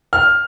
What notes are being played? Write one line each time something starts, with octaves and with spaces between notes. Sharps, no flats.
F6